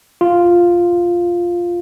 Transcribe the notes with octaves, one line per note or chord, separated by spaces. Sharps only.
F4